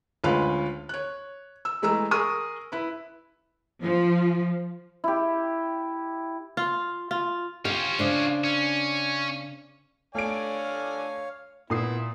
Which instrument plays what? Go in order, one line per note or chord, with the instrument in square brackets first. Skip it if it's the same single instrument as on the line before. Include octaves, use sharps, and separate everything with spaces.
[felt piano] D2 G#3 C#4 F4 B4 F5
C#5 F#6
E6
E3 G#3 A3 A#5 E6
G#4 A#4 C#6 D#6
E4 B4
[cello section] F3
[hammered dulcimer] E4 G4
[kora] F4
F4
[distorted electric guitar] C#4 F4 [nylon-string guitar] G4 F5
[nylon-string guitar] C#3 D4 C5
[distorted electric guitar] C#4
[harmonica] D3 D5 G#5 [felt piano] A3 D7 [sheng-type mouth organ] C#5 F5
[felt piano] A#2 D#6 C7 [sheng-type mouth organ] B3 [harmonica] E4